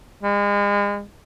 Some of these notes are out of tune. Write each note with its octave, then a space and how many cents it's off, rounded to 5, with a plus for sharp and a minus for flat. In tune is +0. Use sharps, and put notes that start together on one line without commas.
G#3 -35